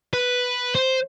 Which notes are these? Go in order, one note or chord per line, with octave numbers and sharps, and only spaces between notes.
B4
C5